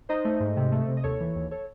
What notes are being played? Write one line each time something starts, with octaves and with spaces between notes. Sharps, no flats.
D#4 C5 D#5
A3
G#2
C3
A3
C3
D#5
D#2 A4 C#5
E3
D#2
A4 C#5